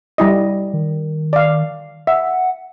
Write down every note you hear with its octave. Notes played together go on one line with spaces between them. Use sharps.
G3 E4 D#5
D#3
D5 F5
E5 F#5